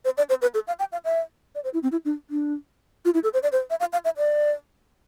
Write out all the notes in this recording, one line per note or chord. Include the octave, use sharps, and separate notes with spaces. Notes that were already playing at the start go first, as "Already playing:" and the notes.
C5
D5
C5
B4
A4
F5
G5
F5
E5
D5
C5
E4
C4
E4
D4
D4
F4
E4
A4
C5
D5
C5
E5
F5
F5
E5
D5